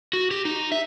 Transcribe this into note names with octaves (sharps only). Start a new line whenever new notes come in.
F#4
G4
D#4
E5